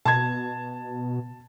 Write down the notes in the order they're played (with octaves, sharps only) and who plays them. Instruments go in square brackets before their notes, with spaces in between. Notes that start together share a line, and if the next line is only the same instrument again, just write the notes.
[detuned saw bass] B2 [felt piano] A5 G#6